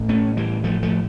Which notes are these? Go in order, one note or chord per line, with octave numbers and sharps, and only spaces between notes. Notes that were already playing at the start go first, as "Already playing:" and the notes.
Already playing: A1 A2
A3 C#4
E3 G3
F3 A3
F3 A3